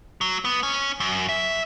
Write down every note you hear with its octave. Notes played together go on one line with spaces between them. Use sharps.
F#3
B3
C#4
F#2
E5